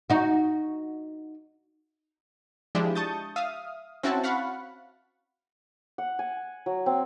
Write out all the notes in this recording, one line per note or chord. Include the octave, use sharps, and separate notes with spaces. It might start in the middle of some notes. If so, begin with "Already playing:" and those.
D#4 F#4
F3 G#3 D4 E4 G4
A5 C#6 D#6 G6 A6
E5 F5 D#6
C4 C#4 E4 F#4 E5 A5
F5 F#5 B5 C#6
F#5
G#5
F#3
C4